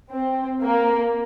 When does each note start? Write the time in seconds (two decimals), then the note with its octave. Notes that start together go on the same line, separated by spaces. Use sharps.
0.11 C4
0.62 A#3